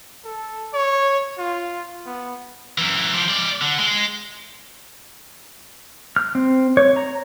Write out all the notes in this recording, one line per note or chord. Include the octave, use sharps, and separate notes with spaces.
A4
C#5
F4
B3
F#2 E3
F3 G4
G#3 D5
D3
G#3
F6
C4
C#5
A#5